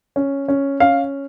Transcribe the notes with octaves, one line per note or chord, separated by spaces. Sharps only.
C#4
C#4
C#4 F5